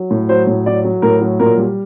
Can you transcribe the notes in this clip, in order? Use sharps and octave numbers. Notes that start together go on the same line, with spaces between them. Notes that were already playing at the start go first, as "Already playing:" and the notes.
Already playing: F#3
A2
F#3 C5
A2
F#3 D5
F#3
A2 A#4
F#3
A#2 A#4
G3